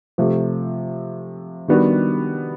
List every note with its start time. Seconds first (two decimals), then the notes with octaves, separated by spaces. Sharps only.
0.18 C3 F3 A3
1.68 D#3 G3 B3 D4 F#4